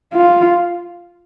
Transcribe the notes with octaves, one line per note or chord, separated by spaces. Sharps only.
F4